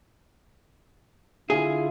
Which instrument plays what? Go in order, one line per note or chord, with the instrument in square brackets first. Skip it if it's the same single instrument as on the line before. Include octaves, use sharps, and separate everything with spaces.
[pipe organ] D3 E4 F4 [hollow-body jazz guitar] G#4